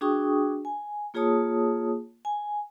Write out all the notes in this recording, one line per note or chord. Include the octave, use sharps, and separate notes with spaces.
D4 F#4 G#4 G5 C#6 D#6
G#5
A#3 F4 G#4 C#5 A5 D#6
G#5